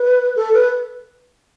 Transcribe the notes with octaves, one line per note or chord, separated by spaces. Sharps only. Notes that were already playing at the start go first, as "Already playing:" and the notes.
Already playing: B4
A4
B4